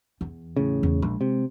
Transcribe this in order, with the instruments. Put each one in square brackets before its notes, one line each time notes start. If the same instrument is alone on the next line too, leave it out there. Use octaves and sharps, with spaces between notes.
[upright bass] E2
[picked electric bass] A2 C#3
[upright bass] E2
[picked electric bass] A#1 [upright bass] G#3
[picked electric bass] C3